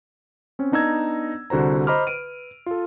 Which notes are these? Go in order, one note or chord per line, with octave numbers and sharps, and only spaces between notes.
C4 C#4
B3 D4 D#4 A#5 E6 G#6
C2 D3 F#4 C5 A#5
C5 D#5 A#5 B5 D6 F6
B4 D7 D#7
F4 A4